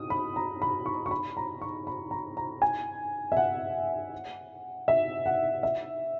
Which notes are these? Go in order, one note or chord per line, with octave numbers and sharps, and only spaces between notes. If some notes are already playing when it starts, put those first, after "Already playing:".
Already playing: D#6
B5
A#5
B5
C#6
C#6
B5
A#5
C#6
B5
A#5
A#5
G#5
E5
F#5
E5
F#5
E5